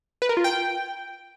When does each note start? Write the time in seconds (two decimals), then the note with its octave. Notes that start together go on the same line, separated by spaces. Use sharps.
0.22 B4
0.29 A#4
0.37 F4
0.44 G5